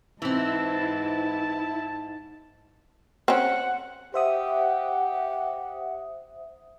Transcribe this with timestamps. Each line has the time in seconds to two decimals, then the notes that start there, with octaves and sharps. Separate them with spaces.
0.22 G#2 E3 C4 E4 A5
3.28 C4 C#4 F#5
4.14 G4 C5 E5 F#5 D#6